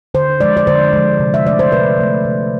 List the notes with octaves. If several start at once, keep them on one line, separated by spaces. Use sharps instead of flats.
D3 C5
F3 G#3 D5
D5
D3 C5
F3 G#3
C3
E5
F3 A3 D5
C5
C3 B4
F3 A3
C3